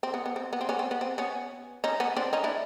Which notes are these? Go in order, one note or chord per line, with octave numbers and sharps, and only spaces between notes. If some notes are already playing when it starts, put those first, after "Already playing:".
C4
B3
B3
C4
B3
C4
B3 C#4
C4
B3
C4
B3 C#4
C#4 D#4
B3 C#4
C4 D4
C#4 D#4
D4 E4